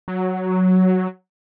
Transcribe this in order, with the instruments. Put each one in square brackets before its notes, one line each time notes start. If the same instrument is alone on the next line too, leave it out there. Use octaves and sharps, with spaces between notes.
[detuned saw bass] F#3